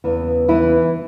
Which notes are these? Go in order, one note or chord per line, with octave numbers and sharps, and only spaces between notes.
E2 C#3 E3
E3 E4